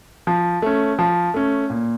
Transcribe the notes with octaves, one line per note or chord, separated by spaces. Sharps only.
F3
A3 C#4
F3
A3 C#4
A#2